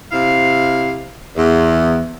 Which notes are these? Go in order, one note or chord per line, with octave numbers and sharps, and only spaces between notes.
C3 E4 F5
E2